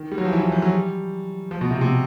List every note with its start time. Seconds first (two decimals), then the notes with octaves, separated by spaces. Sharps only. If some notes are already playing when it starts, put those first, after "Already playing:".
Already playing: D#3
0.12 G3
0.18 F#3
0.25 F3
0.33 E3
0.43 E3
0.52 F3
0.62 F#3
0.73 G3
1.51 F3
1.61 B2
1.71 C3
1.81 C3